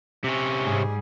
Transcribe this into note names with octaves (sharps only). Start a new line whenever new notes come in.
C3 C#4
G#2 G3 G#4